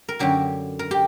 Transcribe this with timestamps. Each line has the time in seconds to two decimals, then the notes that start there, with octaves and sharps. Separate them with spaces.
0.09 A#4
0.19 F#2 D3 F#3 G4
0.79 A#4
0.91 G4